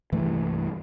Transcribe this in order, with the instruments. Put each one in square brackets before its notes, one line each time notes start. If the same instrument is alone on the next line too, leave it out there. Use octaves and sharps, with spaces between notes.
[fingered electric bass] C2 G2 E3 A3